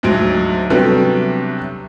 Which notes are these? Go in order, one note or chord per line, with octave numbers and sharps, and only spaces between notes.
D2 G#2 F#3 D7
C3 F#3 G3 A3 B3 D4